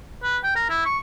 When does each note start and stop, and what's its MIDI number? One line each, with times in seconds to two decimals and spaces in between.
0.23 0.38 71
0.43 0.53 79
0.56 0.65 70
0.69 0.85 64
0.85 0.98 85